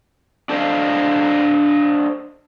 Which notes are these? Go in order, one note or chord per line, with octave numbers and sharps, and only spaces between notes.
D4 A4 C5 C#5 D#5 F5